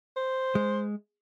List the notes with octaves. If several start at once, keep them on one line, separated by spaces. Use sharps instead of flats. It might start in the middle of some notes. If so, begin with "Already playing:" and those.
C5
G#3